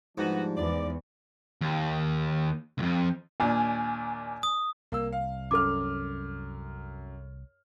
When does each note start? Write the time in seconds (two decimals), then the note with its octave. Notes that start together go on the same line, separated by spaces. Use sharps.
0.18 G#2 F3 G3 B3 D4 F#4
0.57 E2 D5
1.61 D#2
2.78 C2 F2
3.40 D#2 A#2 D4 G#5
4.43 D#6
4.92 C2 A#3 E6
5.12 F5
5.51 F#2 A4 D6 F6